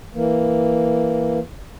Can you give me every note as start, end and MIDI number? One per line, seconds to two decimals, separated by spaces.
0.14 1.39 52
0.14 1.39 58